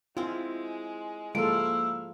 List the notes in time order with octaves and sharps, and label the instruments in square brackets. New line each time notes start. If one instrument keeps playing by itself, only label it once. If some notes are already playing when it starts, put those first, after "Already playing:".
[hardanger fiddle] G#3 [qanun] C4 E4 [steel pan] F4
[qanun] F3 [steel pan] G#3 A4 [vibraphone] A#3 E6 [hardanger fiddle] E4 F5